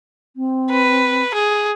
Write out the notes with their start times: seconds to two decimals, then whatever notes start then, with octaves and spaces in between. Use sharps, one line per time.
0.36 C4
0.71 B4
1.34 G#4